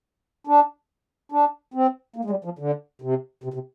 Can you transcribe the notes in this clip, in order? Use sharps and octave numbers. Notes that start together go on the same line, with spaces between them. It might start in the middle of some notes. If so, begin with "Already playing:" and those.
D4
D4
C4
A#3
G#3
G3
F3
D3
C3
C3
C3